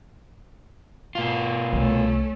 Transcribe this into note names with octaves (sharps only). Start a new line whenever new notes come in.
B2 F4
C2 A3 C#4